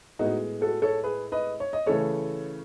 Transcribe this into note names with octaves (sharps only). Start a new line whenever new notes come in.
A2 G#3 B3 D#4 F#4
F#4 A4
A4 C#5
G#4 B4
B4 D#5
C#5
D#5
C#3 E3 A3 A4 C#5